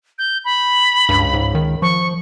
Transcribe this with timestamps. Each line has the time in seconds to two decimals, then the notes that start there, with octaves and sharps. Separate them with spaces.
0.19 G6
0.45 B5
1.09 C#2 G2
1.34 G#2
1.55 D#3
1.82 F3 C#6